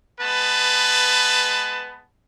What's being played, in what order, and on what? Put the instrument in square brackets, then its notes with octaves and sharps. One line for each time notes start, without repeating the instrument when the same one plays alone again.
[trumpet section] G#3 B3 B4 A5